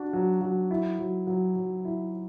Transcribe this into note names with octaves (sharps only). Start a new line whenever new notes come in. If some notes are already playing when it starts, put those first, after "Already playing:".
Already playing: D4 F#4
F#3
F#3
E4
F#3
F#3
F#3
E4